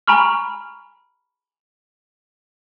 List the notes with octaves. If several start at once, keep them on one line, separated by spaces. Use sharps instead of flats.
G#5 A#5 B5 C#6 F6